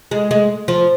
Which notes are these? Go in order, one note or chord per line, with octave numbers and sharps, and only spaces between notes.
G#3
G#3
F3